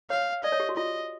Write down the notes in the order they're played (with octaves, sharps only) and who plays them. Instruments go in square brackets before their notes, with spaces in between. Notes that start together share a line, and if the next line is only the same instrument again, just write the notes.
[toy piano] C#5 [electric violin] F5
[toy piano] D5 [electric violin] D#5
[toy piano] C#5
G4
F#4
[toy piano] F4 [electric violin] D#5